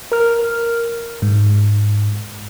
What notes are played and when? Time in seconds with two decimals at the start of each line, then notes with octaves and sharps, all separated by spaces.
0.12 A#4 F6
1.22 G#2